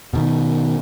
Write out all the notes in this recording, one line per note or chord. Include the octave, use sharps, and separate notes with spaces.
B2 D#3